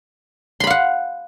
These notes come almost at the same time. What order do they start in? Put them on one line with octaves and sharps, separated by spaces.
C6 B5 F5 F#5